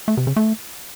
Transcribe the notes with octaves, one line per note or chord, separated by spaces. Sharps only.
A3
C3
C#3
A3